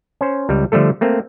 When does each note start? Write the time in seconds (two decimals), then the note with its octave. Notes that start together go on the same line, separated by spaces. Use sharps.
0.21 C#4 C5
0.49 C#2 G3
0.72 D3 F3 G3 A3 A4
1.01 A3 A#3 C4